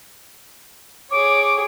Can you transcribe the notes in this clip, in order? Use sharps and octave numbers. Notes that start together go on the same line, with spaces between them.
G#4 C#5 D6